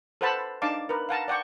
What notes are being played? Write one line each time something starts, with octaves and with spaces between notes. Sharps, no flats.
A4 B4 C5 F#5 A5 B5
D4 D#4 D5 F5 A5 D6
A#4 B4
F5 F#5 A5 A#5
D5 F#5 G5 C#6